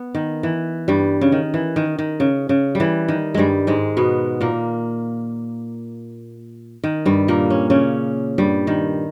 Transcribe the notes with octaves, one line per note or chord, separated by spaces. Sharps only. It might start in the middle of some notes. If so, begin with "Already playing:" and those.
Already playing: B3
D#3
E3
G2 G3
C#3
D#3
E3
D#3
D#3
C#3
C#3
G3
E3
D#3
G2 G3 G#3
G#2 G#3
B2 B3
A#2 A#3
D#3
G2 G3
A#2 A#3
C#4
C#3 C#4
G2 G3
D#3